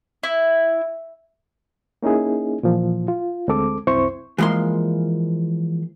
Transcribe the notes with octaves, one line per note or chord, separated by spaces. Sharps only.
E4
A#3 C#4 D#4 E4 G#4
A#2 E3 F3
F4
D2 G#3 C4 A4 D6
C2 F#2 C4 E4 C5 C#6
E3 F3 G#3 A#3 C6